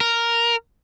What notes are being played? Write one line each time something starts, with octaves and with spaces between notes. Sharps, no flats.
A#4